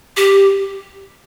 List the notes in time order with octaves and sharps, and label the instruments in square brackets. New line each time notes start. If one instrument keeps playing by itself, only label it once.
[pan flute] G4